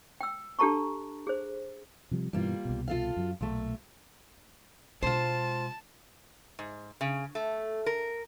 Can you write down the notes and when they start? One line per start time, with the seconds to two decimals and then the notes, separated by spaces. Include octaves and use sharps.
0.21 G5 E6
0.59 D4 G4 A4 A5 A#5 C#6
1.27 G#4 C5
2.11 C3 F3 G3
2.33 G2 B2 E3 G3 A#3 F4
2.65 C2 B2
2.88 F4 A4 F5
3.16 F#2 F#3
3.41 B1 A#2 A3
5.02 B2 G#3 F4 C5 A5
6.59 G#2
7.01 C#3
7.35 A3
7.86 A#4